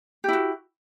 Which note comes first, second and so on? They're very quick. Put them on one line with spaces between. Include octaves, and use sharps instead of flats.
G4 E4 F#4